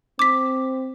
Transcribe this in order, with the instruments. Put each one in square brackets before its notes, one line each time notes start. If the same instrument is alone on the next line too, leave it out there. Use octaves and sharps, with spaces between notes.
[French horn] C4 [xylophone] D6 B6